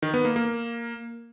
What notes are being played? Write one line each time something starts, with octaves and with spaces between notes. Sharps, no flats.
D#3
B3
A#3
A#3